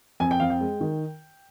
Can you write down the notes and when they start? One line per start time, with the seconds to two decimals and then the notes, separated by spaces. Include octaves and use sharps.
0.20 F2 G#5
0.31 G5
0.40 F2 F5
0.50 G5
0.61 G#3
0.81 D#3